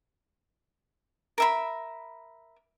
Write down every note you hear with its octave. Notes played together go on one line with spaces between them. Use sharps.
A#4 E5 B5